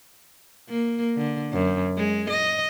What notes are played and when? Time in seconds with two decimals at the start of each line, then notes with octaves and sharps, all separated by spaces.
0.69 A#3
1.17 D3
1.53 F#2
1.98 G#3
2.31 D#5